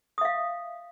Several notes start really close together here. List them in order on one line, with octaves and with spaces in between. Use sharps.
D#6 E5 F5